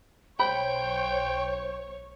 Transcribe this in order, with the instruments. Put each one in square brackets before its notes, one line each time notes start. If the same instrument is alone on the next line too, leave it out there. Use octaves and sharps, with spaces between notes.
[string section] B1 C#5 [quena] C5 [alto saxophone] G5 [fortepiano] B5